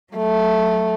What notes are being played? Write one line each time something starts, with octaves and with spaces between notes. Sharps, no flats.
F#3 A3